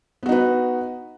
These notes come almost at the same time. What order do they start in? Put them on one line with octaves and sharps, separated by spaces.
B3 F#4 D#4 B4